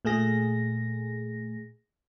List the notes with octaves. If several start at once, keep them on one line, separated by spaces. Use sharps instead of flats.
A#2 A3 G#4 A#6